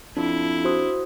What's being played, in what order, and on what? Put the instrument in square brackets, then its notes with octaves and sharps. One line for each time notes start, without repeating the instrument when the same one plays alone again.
[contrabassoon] F2 [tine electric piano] D4 [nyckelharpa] E4
[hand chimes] F#4 C5 D#6